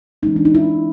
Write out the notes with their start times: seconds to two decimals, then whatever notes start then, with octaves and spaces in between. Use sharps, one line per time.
0.23 E3 G#3 C#4 D#4
0.36 D4
0.45 D#4
0.55 E4